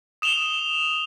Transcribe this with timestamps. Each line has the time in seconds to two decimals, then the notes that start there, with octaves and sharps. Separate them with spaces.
0.22 D#6 E7 F7 G7